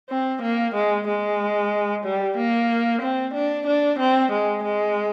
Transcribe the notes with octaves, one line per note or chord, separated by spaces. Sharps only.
C4
A#3
G#3
G#3
G3
A#3
C4
D4
D4
C4
G#3
G#3